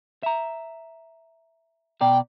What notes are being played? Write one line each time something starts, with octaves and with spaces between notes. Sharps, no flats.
E5 A#5
B2 D5 G5 A#5